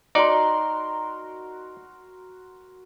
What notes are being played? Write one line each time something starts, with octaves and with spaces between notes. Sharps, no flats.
D#4 F#4 A#4 D5 C6